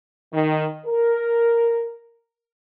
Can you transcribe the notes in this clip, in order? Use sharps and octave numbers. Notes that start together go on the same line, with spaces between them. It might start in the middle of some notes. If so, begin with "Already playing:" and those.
D#3
A#4